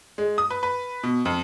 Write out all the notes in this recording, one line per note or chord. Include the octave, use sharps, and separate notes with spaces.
G#3
D#6
B4
B4
B2
F2